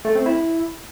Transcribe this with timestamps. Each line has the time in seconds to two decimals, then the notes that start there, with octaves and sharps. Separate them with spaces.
0.05 A3
0.15 C4
0.26 E4